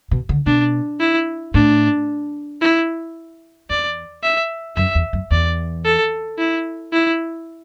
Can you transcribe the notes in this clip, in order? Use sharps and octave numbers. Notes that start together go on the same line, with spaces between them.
B2
D3
B2 D4
E4
A2 D4
E4
E2 D5
E5
F#2 E5
E2
F#2
E2 D5
A4
E4
E4